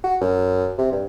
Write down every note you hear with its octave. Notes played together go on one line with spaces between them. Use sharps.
F#4
F#2
C3
G2